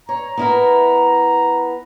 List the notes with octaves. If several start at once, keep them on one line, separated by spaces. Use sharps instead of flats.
C#5 A#5
B3 E4 A#4